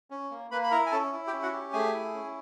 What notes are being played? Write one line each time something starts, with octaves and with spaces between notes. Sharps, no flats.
C#4
A#3
A#3 B4 B5
B5
E4 A#4 A#5
G#5
C#4 A4 A5
E4
G4 G5
C#4
F#4 F#5
G4
A3 G#4 G#5
E4
C#4